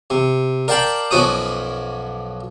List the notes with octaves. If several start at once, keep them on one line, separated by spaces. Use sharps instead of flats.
C3
A#4 D5 F5 G5 A5 B5
B1 F#2 F3 F#4 D6 D#6